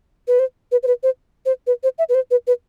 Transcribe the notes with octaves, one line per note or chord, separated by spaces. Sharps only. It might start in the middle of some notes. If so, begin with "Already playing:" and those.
B4
C5
B4
C5
B4
C5
C5
B4
C5
E5
B4
C5
B4
B4